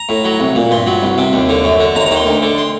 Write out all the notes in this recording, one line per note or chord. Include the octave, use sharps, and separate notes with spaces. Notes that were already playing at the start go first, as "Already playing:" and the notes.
Already playing: A#5
A2
F#3
C2
A#2
G2 C6
F#3
C2
C3
D#2
D3
F#2
D3
D#2 A#5
A#5
D#3
C6
D2
D3
C6